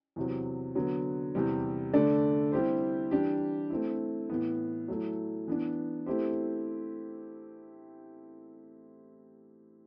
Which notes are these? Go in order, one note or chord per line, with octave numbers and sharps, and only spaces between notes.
E2 C3 F#3
D3 F#3 B3
E2 C3 G3 C4
D3 A3 D4 A4 D5
G3 C4 E4 G4 C5
E3 G3 D4 G4
A3 C4 E4
A2 E3 B3
F#3 A3 E4
E3 B3 D4
A3 C4 E4 G4 C5